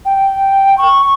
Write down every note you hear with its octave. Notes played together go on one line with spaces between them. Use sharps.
G5
C#6